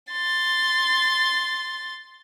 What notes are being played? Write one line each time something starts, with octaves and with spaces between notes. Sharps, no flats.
C6 A6